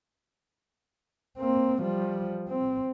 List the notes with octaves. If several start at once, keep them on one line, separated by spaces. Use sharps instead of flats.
A#3 C4
F3 G3
C4